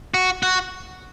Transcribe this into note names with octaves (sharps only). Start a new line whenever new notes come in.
F#4
F#4